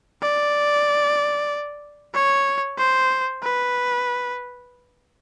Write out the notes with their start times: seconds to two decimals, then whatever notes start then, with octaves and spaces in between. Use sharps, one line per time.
0.22 D5
2.14 C#5
2.78 C5
3.42 B4